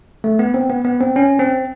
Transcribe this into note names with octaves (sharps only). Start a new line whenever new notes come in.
A3
B3
C4
B3
B3
C4
C#4
C4